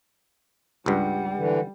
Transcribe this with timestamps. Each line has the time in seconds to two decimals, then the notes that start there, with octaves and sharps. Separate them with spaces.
0.86 C#2 G2 G3 F#5
1.37 D3 E3